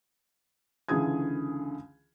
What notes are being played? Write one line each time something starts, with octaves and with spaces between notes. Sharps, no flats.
C#2 D3 E3 G#4 D#6 G#6